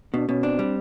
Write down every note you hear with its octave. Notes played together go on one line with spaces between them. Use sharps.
B2 D4
B2 C#4
C4 D4
G3